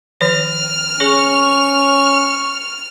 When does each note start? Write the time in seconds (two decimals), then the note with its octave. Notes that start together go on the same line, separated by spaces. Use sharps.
0.21 D#3 F3 C#5 F6
1.00 C#4 G#4 C#5 C#6